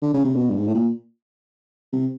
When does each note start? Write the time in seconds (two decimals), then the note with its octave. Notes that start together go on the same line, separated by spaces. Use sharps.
0.02 D3
0.14 C#3
0.24 C3
0.36 B2
0.50 G2
0.58 G#2
0.67 A2
0.74 A#2
1.92 C3